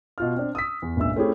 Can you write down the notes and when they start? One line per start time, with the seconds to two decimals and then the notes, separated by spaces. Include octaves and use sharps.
0.18 B2 F4 F6
0.36 C4 D4
0.55 D#6 E6 B6
0.82 E2
0.96 G1 C#2 A#2 E5 E6
1.16 A3 C4 C#4 E4 G4 G#4